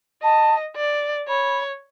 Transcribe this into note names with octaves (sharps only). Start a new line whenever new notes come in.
D#5 A5
D5
C#5 B5